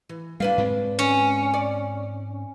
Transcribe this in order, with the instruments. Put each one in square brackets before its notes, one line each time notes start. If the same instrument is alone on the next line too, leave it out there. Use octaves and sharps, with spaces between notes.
[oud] E3
[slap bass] G3 [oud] D4 B4 F5
[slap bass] G#2 G#3 C4
[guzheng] C#4
[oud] D5